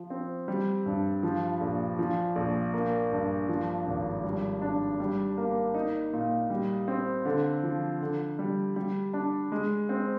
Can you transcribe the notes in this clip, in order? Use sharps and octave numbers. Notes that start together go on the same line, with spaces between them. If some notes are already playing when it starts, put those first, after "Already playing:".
Already playing: F3
C4
G3
G2
F3
A#1
F3
A#1
A#3
G2
F3
G#1
G3
D4
G3
A#3
D#4
A#2
G3
C4
D3
F3
D3
G3
G3
D4
G#3
C4